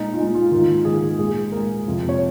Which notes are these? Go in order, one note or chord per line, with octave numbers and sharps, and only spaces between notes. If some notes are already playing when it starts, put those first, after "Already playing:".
Already playing: A#2 G#3 D#4
F4
A#2 G#3 D#4
F4
G#2 D#3 A#3 F4
G#2 D#3 A#3 G#4
A#2 G#3 G#4
A#2 A#4
G#3
F2 C3 F3
C#5